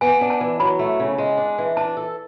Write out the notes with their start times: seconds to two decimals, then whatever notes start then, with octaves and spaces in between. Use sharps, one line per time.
0.01 B3 G#5
0.21 D4
0.30 A5
0.41 E3
0.60 F#3 B5
0.79 A3
1.00 C#3
1.18 G#3
1.37 D4
1.58 E3
1.77 D4 A5
1.97 A4